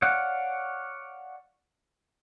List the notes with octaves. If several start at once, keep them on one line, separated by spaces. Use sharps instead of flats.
C#5 D5 F5 F#5